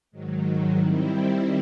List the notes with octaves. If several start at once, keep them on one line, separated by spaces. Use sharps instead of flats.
G#2 D#3 F#3
D#3 G3 C4 E4